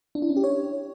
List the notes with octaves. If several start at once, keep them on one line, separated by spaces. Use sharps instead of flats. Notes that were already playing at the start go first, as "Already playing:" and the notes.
D4
E4
C#4
G4
C#5